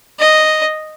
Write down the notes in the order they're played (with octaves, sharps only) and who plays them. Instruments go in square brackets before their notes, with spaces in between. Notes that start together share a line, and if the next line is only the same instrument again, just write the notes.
[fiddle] D#5